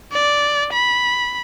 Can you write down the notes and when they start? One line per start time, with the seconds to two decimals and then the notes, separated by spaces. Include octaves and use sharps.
0.12 D5
0.73 B5